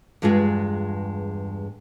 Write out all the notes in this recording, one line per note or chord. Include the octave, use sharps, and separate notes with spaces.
E2 G2 G#3 F4 G#4